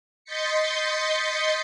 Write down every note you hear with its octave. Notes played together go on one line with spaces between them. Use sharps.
D#5 C6 G6 A6 B6 C#7